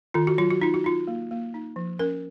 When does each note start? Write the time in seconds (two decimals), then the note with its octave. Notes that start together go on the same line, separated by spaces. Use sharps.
0.14 D#3 F4
0.27 F#4
0.38 F#3 F4
0.50 F#4
0.62 D#4 F4
0.74 F#4
0.84 D#4 F4
1.07 A#3
1.31 A#3
1.54 D#4
1.76 F3
1.99 C#4 A#4